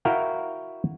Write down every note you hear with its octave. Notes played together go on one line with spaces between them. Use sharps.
E4 F#4 A#4 F5 G5